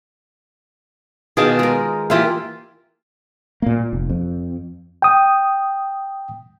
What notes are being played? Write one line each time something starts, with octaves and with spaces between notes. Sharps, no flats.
B2 D#3 F4 G#4 A5 D6
G#3 A#4
E3 A#3 F4 G4 F5
A#2 A#3
F1
F2
G5 D#6